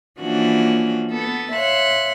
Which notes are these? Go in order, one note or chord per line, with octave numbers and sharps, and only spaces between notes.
E3 F3 A#3 C#4 D4 F#4
B3 A4
C#5 E5 F5 C6 F#6